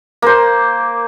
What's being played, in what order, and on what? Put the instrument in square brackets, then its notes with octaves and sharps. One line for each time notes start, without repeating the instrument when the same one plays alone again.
[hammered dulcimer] A#3 C5